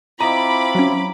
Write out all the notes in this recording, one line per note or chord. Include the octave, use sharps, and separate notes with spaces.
C4 E4 F4 D#5 A#5 B5 D6
F#3 C#4